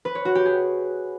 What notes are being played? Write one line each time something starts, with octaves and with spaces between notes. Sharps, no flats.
B4
C#5
F#4
G4
G#4